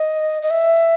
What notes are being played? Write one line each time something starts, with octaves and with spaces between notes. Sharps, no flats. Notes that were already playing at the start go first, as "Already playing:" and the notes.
Already playing: D#5
D#5
E5